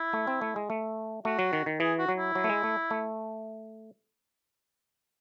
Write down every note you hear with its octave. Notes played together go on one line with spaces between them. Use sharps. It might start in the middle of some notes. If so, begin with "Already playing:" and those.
Already playing: E4
A3
C4
A3
G#3
A3
A3 F#4
F#3
D#3
D#3
E3 G#4
F#4
F#3
E4
F#3
A3
G#3
A3
A3